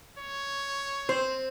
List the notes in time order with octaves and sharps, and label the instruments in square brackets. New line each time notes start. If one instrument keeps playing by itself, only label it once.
[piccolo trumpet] C#5
[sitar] C4 [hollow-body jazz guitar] C5